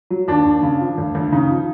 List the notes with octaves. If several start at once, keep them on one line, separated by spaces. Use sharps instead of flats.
F#3
D#2 D4
D#2
C#3
F3
D2
D2
C#3 D#4
F3